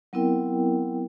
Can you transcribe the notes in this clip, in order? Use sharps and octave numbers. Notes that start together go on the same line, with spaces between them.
F#3 B3 C4 E4 A#4 G5